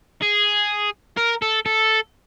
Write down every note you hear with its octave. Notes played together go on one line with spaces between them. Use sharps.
G#4
A#4
A4
A4